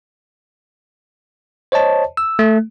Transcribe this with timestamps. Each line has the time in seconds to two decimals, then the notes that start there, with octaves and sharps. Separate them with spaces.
1.72 C5 C#5 D#5 A5
2.17 E6
2.39 A3